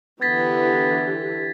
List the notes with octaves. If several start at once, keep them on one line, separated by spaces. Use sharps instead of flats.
D3 E3 B3 G4 G#6 A6 B6